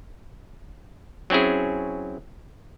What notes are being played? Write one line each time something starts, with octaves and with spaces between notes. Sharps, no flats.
F#3 C4 C#4 E4 G#4